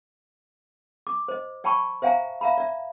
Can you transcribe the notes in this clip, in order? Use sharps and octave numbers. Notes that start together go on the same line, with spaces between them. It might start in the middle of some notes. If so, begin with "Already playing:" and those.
D6
C5 D#5
D5 G5 A5 B5 C#6
C5 E5 F5 G5 G#5 A#5
E5 F5 A#5 B5
D5 E5